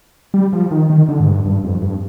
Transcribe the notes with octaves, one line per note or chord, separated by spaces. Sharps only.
G3
F3
D#3
D#3
D3
G#2
G2
G2
F2
G2